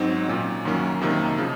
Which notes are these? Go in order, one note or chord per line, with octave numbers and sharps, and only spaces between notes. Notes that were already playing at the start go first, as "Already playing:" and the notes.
Already playing: G#2 F#3 C4 D#4
A#2 F#3 C#4
F#2 D#3 F#3 A#3 C#4
F2 C3 D#3 A#3 D#4
C#3 F3